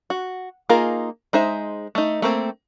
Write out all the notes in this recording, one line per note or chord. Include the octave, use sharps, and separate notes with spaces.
F#4
A#3 D#4 F4 G#4 A#4
G#3 D#4 C5 E5
A3 D#4
A3 A#3 C4